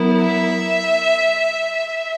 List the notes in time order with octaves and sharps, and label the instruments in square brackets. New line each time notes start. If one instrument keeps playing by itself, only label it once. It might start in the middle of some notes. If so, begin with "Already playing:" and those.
Already playing: [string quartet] F#3 B3 E4 A#4
[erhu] E5